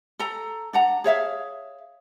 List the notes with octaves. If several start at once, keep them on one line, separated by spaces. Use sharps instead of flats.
A4 A#5
D4 F#5 A#5
G#4 C#5 E5 F5